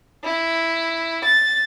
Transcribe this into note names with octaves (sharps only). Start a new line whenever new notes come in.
E4
A6